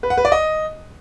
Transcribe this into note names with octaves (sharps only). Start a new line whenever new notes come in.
B4
F#5
B4
D5
D#5